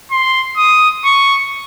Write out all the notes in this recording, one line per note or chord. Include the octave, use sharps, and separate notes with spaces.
C6
D#6
C#6